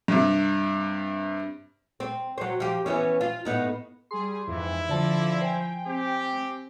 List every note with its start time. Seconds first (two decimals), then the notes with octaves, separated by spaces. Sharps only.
0.08 G2 C3
2.00 C4
2.38 F#3 C5
2.60 F3 G4
2.86 E3 B3 C#4
3.21 F4
3.45 A2 B3 D#4
4.11 G3 G#4 C6
4.47 F2 G#2 E3 E4
4.89 D3 F3 F4 A4 D5 A5
5.41 C5 G5 G#5
5.87 C4 G4